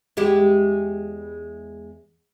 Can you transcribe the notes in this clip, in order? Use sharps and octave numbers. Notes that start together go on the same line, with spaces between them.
E2 G#3 G4